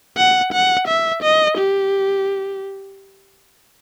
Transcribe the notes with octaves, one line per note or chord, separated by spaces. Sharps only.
F#5
F#5
E5
D#5
G4